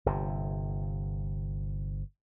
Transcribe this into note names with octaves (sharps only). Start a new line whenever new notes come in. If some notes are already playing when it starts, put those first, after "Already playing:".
G1 C3